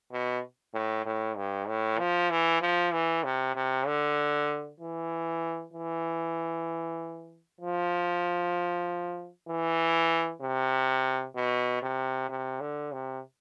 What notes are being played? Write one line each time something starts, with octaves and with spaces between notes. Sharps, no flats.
B2
A2
A2
G2
A2
F3
E3
F3
E3
C3
C3
D3
E3
E3
F3
E3
C3
B2
C3
C3
D3
C3